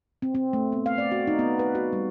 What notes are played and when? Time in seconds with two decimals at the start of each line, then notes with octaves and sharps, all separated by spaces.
0.22 C4
0.35 C4
0.53 A3
0.72 B3
0.86 F5
0.98 D5
1.12 F#4
1.27 D#4
1.39 B3
1.59 B4
1.75 F#4
1.93 G3